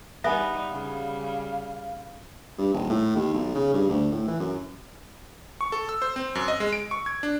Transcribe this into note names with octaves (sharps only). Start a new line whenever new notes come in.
G3 B3 D#4 E5 G#5
C#3 G3 F5
G2
D#1
A2
D#2
B1
C#3
G2
D2
A2
E3
F#2
C#6
A4
E6
C5
C4
F#2
D#5
G#3
D7
C#6
G#6
D4